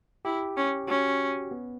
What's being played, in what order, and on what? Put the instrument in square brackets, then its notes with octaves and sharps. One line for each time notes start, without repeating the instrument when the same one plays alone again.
[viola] E4 [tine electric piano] G4
[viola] C#4
[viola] C#4 [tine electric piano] F#4
[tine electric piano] B3